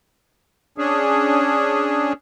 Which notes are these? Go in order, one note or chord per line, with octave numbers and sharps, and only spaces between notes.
C#4 D4 G#4